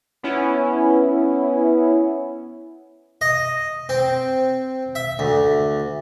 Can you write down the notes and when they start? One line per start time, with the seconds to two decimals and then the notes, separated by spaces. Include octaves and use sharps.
0.23 B3 C#4 E4
3.21 D#5
3.89 C4
4.95 E5
5.19 D2